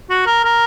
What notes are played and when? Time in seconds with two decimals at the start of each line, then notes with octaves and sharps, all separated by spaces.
0.10 F#4
0.26 A#4
0.45 A#4